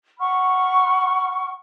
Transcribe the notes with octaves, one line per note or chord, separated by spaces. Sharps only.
F#5 B5 C#6 F6